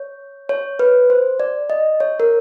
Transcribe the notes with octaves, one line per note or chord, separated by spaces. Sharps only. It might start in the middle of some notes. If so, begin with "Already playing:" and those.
Already playing: C#5
C#5
B4
C5
D5
D#5
C#5
A#4